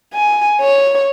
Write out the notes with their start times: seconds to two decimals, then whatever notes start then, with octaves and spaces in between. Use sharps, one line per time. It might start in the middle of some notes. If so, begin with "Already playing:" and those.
0.14 G#5
0.61 C#5